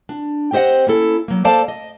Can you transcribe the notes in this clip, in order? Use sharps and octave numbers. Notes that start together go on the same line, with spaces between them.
D4
C4 G4 C5 D#5 F#5
A#3 C#4 E4 A4
F#3 A#3
A#3 A4 C5 D5 F5 A5
D#5